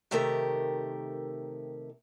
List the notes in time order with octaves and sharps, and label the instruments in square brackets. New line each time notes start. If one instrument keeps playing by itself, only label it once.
[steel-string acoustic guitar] C3 D#3 A3 G4 A#4